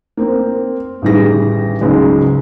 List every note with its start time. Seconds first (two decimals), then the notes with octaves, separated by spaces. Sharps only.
0.17 A#3 C4
1.02 A1 D3 D#3 G3 G#4 A#6
1.81 C#2 G#2 F#3 G#3